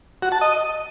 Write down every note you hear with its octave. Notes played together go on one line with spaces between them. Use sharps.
F#4
A5
D#5